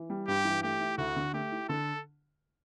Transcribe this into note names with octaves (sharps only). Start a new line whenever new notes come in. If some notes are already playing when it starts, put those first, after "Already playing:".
Already playing: E3
G3
G2 G4
E3
A3 G4
E4
D2 F#4
D3
A3 G4
E4
D3 A4